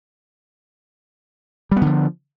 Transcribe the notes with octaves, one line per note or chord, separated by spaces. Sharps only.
D3 F3 G3 B3